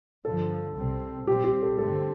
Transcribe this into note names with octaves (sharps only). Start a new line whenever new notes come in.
G2 D3 F3 A4
C2 C3 G3 C4
A#2 G3 C4 G4
G4
A4
G2 D3 A3 C4 A4